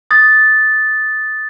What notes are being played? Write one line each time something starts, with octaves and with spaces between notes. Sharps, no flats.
D#6 A6